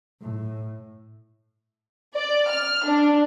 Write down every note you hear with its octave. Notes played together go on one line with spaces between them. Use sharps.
A2
D5
F6
D4